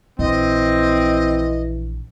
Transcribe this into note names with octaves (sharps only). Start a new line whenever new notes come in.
A#1 E3 C4 D#5